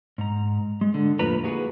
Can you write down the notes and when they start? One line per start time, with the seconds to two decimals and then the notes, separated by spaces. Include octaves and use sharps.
0.18 G#2 A#5
0.81 G#3
0.94 D3
1.19 F2 A2 A#3 F4 B4 A#5
1.43 A#3 E4 F#4 G#4 B4